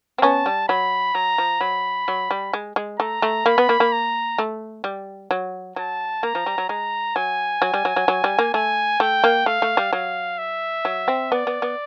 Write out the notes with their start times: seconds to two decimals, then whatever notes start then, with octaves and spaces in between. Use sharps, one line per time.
0.18 C4
0.22 B3 C#4 A5
0.46 G3
0.68 F#3 B5
1.15 F#3 A#5
1.38 F3
1.61 F#3 B5
2.08 F#3
2.31 G3
2.53 G#3
2.76 G#3
2.99 A3 A#5
3.22 A3
3.46 A#3 B5
3.58 B3
3.69 A#3
3.80 A#3
3.92 A#5
4.38 A3
4.84 G3
5.31 F#3
5.76 F#3 A5
6.23 A#3 A#5
6.35 F3
6.46 G3
6.58 F#3
6.69 G#3 A#5
7.16 F#3 G#5
7.62 F#3
7.74 G3
7.85 F#3
7.96 F#3
8.08 F#3
8.24 G3
8.39 A#3
8.54 A3 G#5
9.00 A3 G5
9.24 A#3
9.46 A3 F5
9.62 A3
9.77 G3
9.93 F#3 F5
10.38 E5
10.85 F#3
11.08 C4
11.32 B3 D5
11.47 B3
11.62 B3